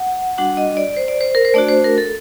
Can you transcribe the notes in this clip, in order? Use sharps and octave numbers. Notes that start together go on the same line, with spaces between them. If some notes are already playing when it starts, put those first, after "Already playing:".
Already playing: F#5
G3 D4 F#4 F#5
D#5
D5
C5
D5
C5
A#4
C5
A3 D4 F#4 D5
C5
A#4
A4